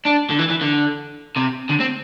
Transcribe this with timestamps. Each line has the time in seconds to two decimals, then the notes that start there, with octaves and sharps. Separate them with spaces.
0.06 D4
0.30 D3
0.39 E3
0.50 E3
0.61 D3
1.36 C3
1.69 D3
1.80 C4